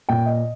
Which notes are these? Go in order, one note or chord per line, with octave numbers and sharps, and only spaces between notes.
A#2 G5
D#5